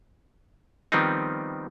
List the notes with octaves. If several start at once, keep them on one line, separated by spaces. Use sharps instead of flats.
D#3 F3 G3 B3 C4 D#4